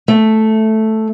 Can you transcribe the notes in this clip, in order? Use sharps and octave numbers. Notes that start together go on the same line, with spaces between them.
A3